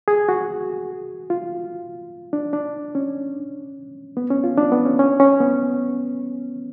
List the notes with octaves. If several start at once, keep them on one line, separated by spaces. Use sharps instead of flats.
G#4
F#4
F4
D4
D4
C#4
B3
C#4
F4
D4
B3
C#4
C#4
C#4
B3